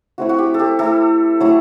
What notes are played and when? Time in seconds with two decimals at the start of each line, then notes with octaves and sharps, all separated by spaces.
0.18 A3 C4 E4 F#4
0.29 F#4
0.39 G4
0.54 A4
0.59 G4
0.79 A3 E4 A4
1.40 F#3 A3 E4